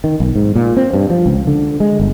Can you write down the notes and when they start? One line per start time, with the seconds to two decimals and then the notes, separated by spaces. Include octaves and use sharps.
0.04 D#3
0.20 B1
0.36 G#2
0.55 A#2
0.77 C4
0.93 G2
1.10 F3
1.26 C#2
1.47 D3
1.80 G#3
2.00 G1